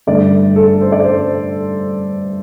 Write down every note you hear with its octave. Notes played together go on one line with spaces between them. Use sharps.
G2 D3 A3 D5
A4
C5
D5
C5